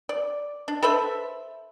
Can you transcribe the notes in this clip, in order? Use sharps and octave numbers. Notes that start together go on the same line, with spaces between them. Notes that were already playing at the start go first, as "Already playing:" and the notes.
D5
D4
A4 B4 C5 E5